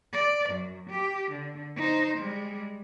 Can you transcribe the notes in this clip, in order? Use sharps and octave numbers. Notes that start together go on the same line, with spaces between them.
D5
F#2
G4
D3
D#4 C5
G3 G#3